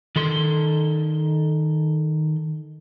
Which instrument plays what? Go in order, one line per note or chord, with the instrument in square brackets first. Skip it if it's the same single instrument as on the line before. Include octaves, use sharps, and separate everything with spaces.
[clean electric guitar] D#3 A4 C6